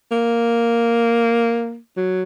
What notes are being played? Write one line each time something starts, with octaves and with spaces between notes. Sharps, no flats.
A#3
F#3